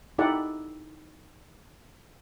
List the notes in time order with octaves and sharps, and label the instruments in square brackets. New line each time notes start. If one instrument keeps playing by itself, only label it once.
[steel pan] D#4 E4 G4 A4 D5 F#5